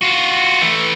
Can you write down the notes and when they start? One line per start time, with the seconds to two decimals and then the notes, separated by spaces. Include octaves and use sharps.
0.01 F4 F#4
0.62 E3 A3